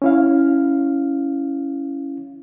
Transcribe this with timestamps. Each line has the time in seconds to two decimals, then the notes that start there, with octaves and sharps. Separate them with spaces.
0.02 C#4 E4 F5